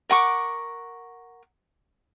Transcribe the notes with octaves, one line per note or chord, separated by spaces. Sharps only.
A#4 F#5 C#6 D6